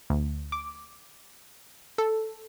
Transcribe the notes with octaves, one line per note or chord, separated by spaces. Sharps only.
D2
D6
A4